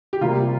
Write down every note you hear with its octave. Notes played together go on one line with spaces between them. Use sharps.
G4
C3 G3 A#3 F4